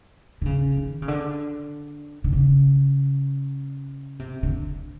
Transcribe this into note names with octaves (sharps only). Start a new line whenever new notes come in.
D3
C#3
D#3
C#3
D3
D3
C#3
C3
D3